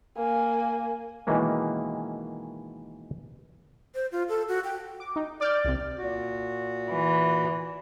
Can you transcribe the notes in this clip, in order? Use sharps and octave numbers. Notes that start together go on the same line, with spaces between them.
A#3 G#5
B2 D#3 E3 G#3 A#3 C#4
C5
F4
A4
F#4
G5
D6
D#4
D5 D6 F6 G6
C2 C3
A#2 F#4
E3